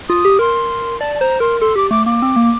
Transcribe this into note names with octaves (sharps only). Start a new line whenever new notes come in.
F4 D#6
G4
A#4 C6
D5 A5
A5
C5 A#5
A#4 C6
A4 C6
G4 D6
A3 D6
A#3 D6
C4
A#3